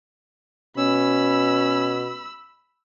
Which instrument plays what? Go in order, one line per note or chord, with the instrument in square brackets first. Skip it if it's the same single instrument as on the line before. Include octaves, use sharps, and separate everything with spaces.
[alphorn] B2 [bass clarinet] C#4 [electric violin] B5 E6